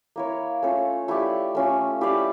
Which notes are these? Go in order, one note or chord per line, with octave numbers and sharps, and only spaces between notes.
A#3 E4 A#4 C#5
A3 C#4 F4 A4
A3 E4 G4 D5
A3 C#4 F4
E4 G4 D5 F5